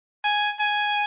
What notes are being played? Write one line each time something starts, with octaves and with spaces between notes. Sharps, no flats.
G#5
G#5